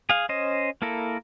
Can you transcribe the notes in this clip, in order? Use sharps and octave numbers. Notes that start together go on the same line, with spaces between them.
G#4 F5
C#4 C5 D#5
A#3 E4 A4 A#4